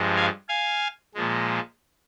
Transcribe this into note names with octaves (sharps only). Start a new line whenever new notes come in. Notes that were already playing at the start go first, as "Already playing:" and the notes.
Already playing: G2 F3 G#3
F5 G#5
F5 G#5
A#2 F3 G#3